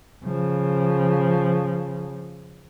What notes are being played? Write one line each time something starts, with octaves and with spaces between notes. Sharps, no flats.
C#3 F3